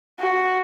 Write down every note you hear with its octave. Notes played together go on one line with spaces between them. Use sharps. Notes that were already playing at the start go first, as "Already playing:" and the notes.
F#4